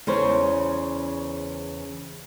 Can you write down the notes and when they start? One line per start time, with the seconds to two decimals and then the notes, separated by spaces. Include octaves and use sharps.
0.07 E2 C#3 C5 C#5